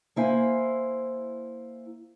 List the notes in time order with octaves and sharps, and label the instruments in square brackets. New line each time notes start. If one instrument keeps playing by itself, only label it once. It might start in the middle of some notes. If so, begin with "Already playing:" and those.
[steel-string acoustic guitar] A#3 E4 C5 G#5